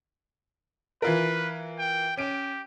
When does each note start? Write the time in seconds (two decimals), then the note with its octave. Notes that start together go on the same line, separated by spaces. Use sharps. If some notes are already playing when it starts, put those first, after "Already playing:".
1.02 E3 F4 A#4 B4
1.78 G5
2.17 C#4 G4 D7